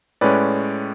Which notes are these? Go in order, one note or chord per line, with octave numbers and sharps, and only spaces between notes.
A2 G#3 C#4 B4 D5